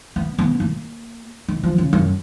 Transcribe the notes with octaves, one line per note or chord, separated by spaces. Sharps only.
B3
B3
A#3
D#3
F3
C#3
F#2